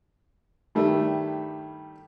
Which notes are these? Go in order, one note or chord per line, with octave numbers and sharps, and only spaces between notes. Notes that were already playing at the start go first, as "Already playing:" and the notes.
G2 D#3 G3 A3